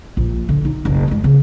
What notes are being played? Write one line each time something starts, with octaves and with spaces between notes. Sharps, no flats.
A#1
D3
D#4
F#1 B1
F#2 G#3
C#3 C4